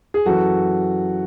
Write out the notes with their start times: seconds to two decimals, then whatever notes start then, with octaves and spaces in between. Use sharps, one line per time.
0.14 G#4
0.26 F#2 E3 F#4 A4